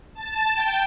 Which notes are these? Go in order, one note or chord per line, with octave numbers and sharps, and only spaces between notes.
A5
G5